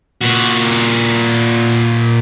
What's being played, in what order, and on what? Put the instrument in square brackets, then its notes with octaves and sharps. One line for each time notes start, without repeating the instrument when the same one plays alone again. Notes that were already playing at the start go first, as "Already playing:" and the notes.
[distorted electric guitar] A#2 F#4